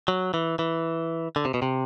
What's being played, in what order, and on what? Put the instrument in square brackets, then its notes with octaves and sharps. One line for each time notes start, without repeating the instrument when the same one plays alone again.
[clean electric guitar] F#3
E3
E3
D3
C3
B2
C3